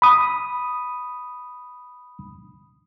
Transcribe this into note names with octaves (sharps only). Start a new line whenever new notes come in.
B5 D#6